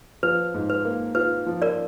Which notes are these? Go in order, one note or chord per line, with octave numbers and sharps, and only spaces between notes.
F3 B4
G#2
B4
A#3
F4 B4
F3
A#4 D5